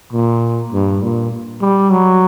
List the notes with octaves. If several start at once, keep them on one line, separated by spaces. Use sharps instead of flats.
A#2
G2
A#2
G3
F#3